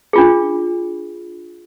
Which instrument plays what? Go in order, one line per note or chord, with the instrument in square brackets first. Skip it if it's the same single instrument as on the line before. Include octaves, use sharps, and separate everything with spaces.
[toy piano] D4 F4 G#4